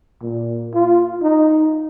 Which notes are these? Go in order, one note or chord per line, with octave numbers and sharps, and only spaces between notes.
A#2
F4
D#4